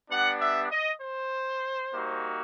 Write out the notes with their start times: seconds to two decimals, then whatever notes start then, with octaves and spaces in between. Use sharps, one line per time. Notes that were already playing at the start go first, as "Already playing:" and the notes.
0.10 G3 B3 D4 F#5
0.41 E5
0.71 D#5
1.02 C5
1.93 G3 A#3 D#4 F#4